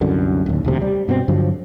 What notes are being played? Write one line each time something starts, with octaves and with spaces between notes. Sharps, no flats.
C2 F#2 D3
D1 D#2
E1 D2 C3
G3
G2 B2 F3 C4
G2 D3 F3 F#3